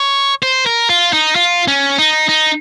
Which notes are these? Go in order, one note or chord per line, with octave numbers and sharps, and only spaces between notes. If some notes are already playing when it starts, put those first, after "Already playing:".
Already playing: C#5
C5
A#4
F4
D#4
F4
C#4
D#4
D#4